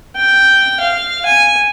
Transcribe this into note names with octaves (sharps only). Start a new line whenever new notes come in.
G5
F5
G#5